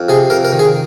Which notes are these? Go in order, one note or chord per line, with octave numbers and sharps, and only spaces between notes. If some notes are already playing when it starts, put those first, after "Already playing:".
Already playing: F2
C3 G#4
F2 A#4
A#4
D#3
G#4